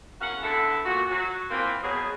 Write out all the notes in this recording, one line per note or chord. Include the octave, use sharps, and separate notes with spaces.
E2 C#4 F#4 A#4 F5 F#5
D3 A3 B3 E4 A4
A#2 F#4
F#3 F#4
A#2 E3 A#3 C4
B2 F#3 G#4